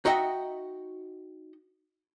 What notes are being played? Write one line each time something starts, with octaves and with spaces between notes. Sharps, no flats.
D#4 F#4 D#5 E5 G5